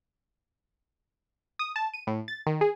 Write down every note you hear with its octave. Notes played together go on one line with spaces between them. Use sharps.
D#6
A5
D#7
A2
A6
D#3
G#4